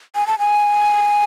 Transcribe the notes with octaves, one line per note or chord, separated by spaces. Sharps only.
G#5
A5
G#5